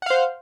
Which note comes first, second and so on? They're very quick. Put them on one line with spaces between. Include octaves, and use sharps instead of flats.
F#5 F5 C5